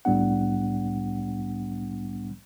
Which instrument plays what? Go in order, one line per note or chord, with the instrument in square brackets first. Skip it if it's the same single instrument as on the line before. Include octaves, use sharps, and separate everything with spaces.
[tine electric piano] C2 A2 G3 B3 D4 F#5